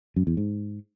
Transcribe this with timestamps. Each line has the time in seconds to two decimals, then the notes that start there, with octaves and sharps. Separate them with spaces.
0.16 F#2
0.27 E2
0.37 G#2